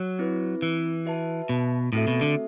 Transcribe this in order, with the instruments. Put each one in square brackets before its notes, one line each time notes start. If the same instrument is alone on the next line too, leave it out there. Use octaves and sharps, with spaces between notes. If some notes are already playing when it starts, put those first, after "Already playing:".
Already playing: [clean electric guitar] F#3
[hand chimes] C4 E4 B4
[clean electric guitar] E3
[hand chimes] F#4 B4 E5 A5
[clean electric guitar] B2
[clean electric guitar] A2 [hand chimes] A3 C4 F#4 A4 E5
[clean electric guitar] B2
D3